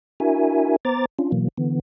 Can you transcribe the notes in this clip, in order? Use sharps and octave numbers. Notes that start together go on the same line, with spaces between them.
D4 E4 F#4 A#4 E5 G#5
B3 C5 A#5 D6 A6
C#4 D4 F4
B2 E3 F#3 A#3
D3 E3 B3